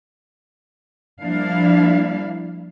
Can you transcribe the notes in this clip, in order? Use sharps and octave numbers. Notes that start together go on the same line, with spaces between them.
F3 G3 A#3 D4 E4 F5